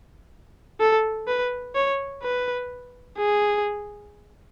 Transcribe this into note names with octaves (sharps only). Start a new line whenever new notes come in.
A4
B4
C#5
B4
G#4